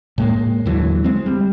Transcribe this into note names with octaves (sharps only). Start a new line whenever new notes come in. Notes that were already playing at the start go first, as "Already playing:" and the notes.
A2 G#3 A#3
D#2 D3 E3 F#3
G#3 C4
G3